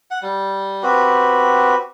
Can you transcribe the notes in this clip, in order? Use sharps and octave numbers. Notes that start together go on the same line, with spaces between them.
F#5
G3
C4 F#4 G4 B4